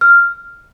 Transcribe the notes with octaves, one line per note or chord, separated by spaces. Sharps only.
F6